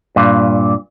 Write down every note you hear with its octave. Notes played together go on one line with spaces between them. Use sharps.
G2 A#2